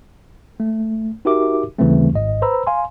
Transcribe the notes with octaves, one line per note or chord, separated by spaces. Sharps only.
A3
D#4 F#4 G4 A#4 E5 D6
D#2 C#3 E3 G3 A3 C4
G#1 G#2 D#5
B4 C5 A#5 B5 E6
F5 G#5 C6